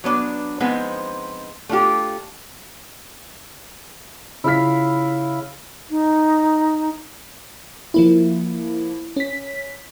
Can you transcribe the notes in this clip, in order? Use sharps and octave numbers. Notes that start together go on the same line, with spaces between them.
F#3 B3 D4
F3 G#3 B3 C4 D#4
A3 D4 F4 G4
C#3 E4 F4 F5 B6
D#4
F3 A#3 E4
C#4 B6